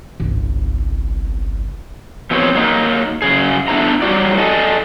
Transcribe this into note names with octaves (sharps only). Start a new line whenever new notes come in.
G1 C2
F3 B3 C4 G4 C#5
F#3 A#3 D#4
F#2 C#3 G#4
A3 B3 D4 E4 C5 A#5
F#3 G3 D#4 F#4 D5
A4 D5 D#5 G#5 A5